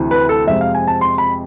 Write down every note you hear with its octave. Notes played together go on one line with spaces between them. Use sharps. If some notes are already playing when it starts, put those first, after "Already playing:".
Already playing: D2 C3 E3
B4
A4
F2 C3 G#3 E5
F5
G#5
A5
C6
B5